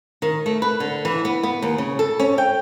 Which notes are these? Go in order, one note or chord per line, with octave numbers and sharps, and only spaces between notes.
D#3
A3
B4
D3
E3
B3
B3
D#2
C#3
A4
C#4
G5